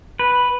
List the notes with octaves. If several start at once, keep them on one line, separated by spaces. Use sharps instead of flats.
B4